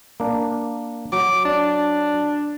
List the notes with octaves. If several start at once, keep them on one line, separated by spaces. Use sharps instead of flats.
A#3 D4
F#3 D6
D4